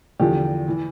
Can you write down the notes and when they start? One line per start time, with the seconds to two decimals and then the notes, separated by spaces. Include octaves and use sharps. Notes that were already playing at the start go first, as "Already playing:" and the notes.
0.19 E2 D3 F3 G4
0.68 E3